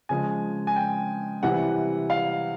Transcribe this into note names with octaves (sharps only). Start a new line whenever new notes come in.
C#3 F3 G#3 G#5
G#5
G5
C3 E3 G3 F#5
F5